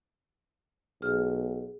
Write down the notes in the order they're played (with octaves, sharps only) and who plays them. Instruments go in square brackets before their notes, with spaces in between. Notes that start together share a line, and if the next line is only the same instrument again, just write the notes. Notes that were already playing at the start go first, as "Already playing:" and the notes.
[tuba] B1 [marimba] G#4 F6